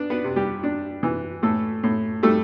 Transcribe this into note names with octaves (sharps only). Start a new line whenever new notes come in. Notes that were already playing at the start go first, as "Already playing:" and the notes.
Already playing: B3 D4 D5
B3 B4
C3
G3 G4
D4
E3
A2 A3 A4
A2
G3 A3 A4